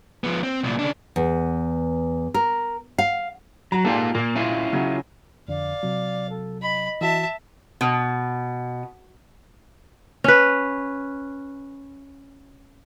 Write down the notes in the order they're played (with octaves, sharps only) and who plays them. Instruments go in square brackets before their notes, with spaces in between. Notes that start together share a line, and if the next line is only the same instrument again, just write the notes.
[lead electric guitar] F3 B3
C4
C2 A#2
C#3 D4
[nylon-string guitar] E2
A#4
F5
[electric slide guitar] F#3 [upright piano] A#5
[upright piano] G#2 G4 A4 [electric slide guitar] A#3 F4
[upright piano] A#2 [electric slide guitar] A#3
[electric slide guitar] C#4 E4 F4
[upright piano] C#3 F#3
[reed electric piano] F2 D3 [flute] D5 [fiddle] F5
[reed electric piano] C3 F#3
[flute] A4
[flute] D#5 [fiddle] B5
[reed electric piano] E3 F#4 [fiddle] E5 A5
[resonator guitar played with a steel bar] B2
[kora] C#4 B4